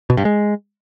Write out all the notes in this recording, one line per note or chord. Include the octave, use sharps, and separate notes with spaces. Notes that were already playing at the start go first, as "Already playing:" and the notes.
B2
G2
G#3